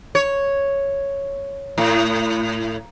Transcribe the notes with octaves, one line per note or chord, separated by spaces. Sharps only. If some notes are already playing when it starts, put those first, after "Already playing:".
C#5
A2